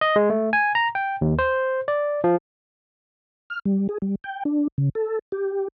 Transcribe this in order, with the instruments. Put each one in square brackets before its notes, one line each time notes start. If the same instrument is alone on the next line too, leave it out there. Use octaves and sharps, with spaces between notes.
[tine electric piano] D#5
G#3
A3
G#5
A#5
G5
D#2
C5
D5
F3
[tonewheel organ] F6
G3
G#4
G3
G5
D4
C#3
A4
G4